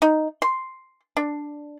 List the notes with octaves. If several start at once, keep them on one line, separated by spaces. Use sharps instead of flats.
D#4
C6
D4